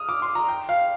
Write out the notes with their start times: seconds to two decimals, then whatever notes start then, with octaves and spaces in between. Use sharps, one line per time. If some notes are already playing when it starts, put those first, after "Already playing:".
Already playing: D#6 F6
0.09 D6
0.22 C6
0.35 A#5
0.48 G5
0.69 F5